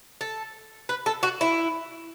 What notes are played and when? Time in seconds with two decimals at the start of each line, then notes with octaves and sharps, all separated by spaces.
0.21 A4
0.89 B4
1.06 A4
1.23 F#4
1.41 E4